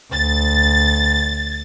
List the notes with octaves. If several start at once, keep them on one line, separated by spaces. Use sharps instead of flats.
D2 A6